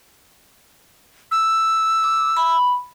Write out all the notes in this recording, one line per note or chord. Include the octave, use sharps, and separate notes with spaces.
E6
D6
B5